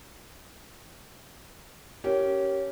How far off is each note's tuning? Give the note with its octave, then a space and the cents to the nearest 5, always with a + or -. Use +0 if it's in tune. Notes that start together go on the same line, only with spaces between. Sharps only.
C#4 +0 G4 -20 A#4 +0